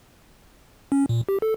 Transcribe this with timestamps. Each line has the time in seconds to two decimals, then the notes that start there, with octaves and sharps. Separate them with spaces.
0.92 C#4
1.09 A#2
1.29 G4
1.42 A4